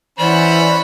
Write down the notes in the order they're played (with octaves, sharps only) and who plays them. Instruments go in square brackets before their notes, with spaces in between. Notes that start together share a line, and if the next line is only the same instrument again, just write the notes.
[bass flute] E3 [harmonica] C#4 B5 [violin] C5 F#5 [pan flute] D5